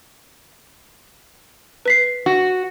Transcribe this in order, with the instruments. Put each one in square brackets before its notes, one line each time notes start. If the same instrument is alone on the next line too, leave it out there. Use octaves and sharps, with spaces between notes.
[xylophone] B4 B6 C7
[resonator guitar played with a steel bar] F#4